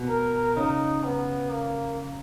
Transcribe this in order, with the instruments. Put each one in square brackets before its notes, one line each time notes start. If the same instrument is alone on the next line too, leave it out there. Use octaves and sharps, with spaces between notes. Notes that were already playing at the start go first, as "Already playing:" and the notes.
Already playing: [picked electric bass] B2
[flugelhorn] A#4
[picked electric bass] C#3 [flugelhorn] D#4
[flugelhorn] B3
A#3